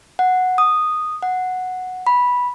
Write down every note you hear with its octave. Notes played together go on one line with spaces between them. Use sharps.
F#5
D#6
F#5
B5